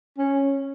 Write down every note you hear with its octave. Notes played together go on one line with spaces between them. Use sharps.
C#4